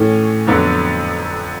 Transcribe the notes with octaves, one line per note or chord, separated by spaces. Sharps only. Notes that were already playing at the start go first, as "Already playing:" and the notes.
Already playing: A2 E3 A3 C#4
F2 D3 F#3 B3